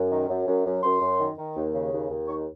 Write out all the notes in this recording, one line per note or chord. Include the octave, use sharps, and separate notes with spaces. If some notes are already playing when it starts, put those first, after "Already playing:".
Already playing: F#2
D#3
F#2
F#2
F#2
F#2 C6
F#2
D#3
D#3
D#2
C#3
D#2
D#2
D#3 C#6